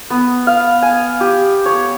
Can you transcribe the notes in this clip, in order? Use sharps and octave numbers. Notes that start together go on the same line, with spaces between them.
B3
F5
G#5
G4
C#5